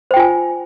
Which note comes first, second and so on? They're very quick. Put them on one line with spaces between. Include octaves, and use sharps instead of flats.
C5 G5 F4 G#5